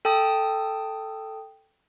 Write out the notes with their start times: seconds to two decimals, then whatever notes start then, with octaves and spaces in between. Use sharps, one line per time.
0.05 A4 G5 A5 D#6